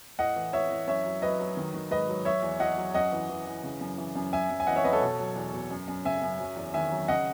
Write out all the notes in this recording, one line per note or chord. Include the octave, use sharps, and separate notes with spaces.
A2 D#5 F#5
E3
E3 C#5 E5
E3
F#2 C#5 E5
F#3
F#3 B4 D#5
F#3
D#3
D#3
G#2 B4 D#5
F#3
F#3 C#5 E5
E2
E2 D#5 F#5
F#3
F#2 D#5 F#5
E3
E3
E3
C#3
F#2
E3
F#2
F#2 E5 G#5
F#2
G#5
E3 D#5 F#5
C#5 E5
F#2 B4 D#5
A4 C#5
B2
F#3
E2
B2
F#2
F#2
C#3 E5 G#5
F#2
F#3
E2
D#3 E5 G#5
F#3
C#3 D#5 F#5